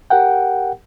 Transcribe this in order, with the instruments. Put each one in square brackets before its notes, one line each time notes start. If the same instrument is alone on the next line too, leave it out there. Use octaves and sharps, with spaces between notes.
[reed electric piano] G4 A#4 F#5 G5